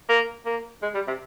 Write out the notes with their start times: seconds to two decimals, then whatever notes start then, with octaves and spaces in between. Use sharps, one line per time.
0.09 A#3
0.45 A#3
0.82 G#3
0.94 G3
1.07 C3